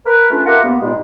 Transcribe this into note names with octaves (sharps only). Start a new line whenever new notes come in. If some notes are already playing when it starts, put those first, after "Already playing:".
A#4 B4
A3 C#4 D4 F4 B4
F4 G4 A#4 E5 F#5
G2 A#3 B3
G2 A#2 G#3 D#4 G4